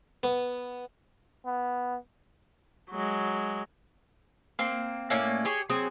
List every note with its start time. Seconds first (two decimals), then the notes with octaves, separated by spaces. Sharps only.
0.23 B3
1.45 B3
2.90 F#3 G#3
4.59 A#3 C4
5.10 A2 A#3 C#4 D5
5.45 G4 G#4 C#5
5.70 F#3 C4 G#4